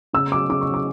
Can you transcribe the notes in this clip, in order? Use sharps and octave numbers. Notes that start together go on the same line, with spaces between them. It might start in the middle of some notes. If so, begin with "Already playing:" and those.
C#3 E6
F#3 D6
C#3 D6
C#6
F#3
D6